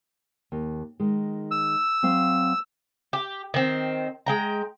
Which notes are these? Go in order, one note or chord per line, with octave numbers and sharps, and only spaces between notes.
D#2
D#3 G#3
E6
F#3 C4 F5
G4
D#3 C4
G#3 G5 A#5